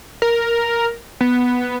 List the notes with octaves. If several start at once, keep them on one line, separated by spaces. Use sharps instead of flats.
A#4
B3